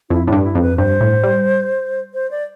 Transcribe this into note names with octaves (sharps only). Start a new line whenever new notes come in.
F2 E4
A2 D4
G2
E4
F2
B4
G2 C5
A2
G3
C5
D5